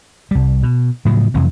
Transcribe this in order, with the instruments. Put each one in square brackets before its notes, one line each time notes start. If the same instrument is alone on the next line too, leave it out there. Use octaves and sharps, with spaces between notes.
[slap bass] C2 G3
B2
A2 C#3 F3 F#3
F2 C3 E3 F#3